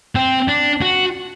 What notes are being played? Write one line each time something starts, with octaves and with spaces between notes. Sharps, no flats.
C4
D4
F#4